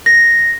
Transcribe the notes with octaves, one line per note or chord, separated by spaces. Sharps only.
A#6